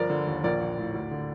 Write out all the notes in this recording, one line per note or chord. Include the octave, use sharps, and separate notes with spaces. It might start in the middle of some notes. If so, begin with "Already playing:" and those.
Already playing: G1 F3 A#4 D5
D3
D#2
A#1 A#4 D5
A#1
A2
D2
D3